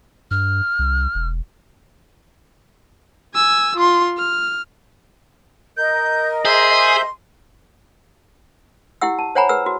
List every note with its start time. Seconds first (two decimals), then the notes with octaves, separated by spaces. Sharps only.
0.31 G2 F6
0.79 C2
1.15 E1
3.34 G#5 E6
3.76 F4 C6
4.18 F6
5.77 A#4 D#5 G6
6.45 G#4 C5 E5 C6 G6
9.01 E4 G4 F#5 E6
9.19 A5
9.35 C5 C#5 F#5 G#5 A#5 B5
9.49 G#4 B4 F#5 E6
9.66 F#4